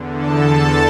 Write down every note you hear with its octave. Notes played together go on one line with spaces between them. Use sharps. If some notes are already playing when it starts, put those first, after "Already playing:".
Already playing: E2 D3
A4 A5